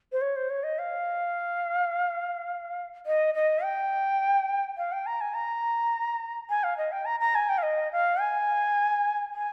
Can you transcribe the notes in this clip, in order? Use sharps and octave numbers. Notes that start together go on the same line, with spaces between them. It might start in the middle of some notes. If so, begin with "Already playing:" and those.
C5
C#5
C5
C#5
D#5
F5
D#5
D#5
G5
F5
G5
A#5
G#5
A#5
G#5
F5
D#5
G5
A#5
A#5
G#5
G5
F5
D#5
F5
G#5
G#5